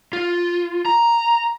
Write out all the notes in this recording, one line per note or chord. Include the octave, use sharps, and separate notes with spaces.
F4
A#5